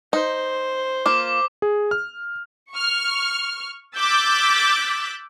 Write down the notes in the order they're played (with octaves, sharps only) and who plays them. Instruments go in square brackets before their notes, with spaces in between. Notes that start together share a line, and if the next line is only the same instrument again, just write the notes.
[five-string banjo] D#4 [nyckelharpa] C5
[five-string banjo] A#3 F4 [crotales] D6
[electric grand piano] G#4
F6
[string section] C#6 F6
D6 E6 F#6 G6 A6 B6